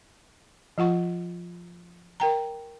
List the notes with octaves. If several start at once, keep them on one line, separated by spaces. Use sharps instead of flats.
F3 F4 F#5 C#6
A#4 G5 A#5